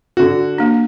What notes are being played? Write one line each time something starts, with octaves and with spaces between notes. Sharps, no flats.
D3 F#4
A#3 D4